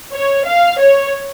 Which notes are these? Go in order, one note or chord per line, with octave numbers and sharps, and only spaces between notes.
C#5
F5
C#5